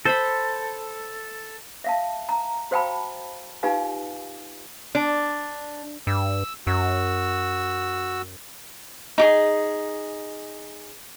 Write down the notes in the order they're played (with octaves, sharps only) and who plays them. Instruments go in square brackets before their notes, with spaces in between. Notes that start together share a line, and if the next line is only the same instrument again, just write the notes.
[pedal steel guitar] A4 [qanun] C5 B5
[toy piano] E5 F5 A5
A#5
F#4 C5 F5 G5 A5 B5
D#4 F4 G4 B4 F5 G#5
[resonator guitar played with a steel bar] D4
[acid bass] G2 [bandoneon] E6
[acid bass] F#2 [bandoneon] F#4 E6
[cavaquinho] D#4 G4 G#4